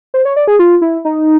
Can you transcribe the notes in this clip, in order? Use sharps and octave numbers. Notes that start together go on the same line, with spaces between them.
C5
C#5
D5
G#4
F4
E4
D#4